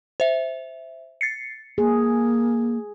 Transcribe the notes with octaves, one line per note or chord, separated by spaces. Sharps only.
C5 E5
A6 C7 C#7
A#3 G#4